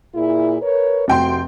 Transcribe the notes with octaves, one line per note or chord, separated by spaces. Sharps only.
A#2 E4 G#4
A#4 B4 C#5
F1 C3 A3 F#4 G5 C6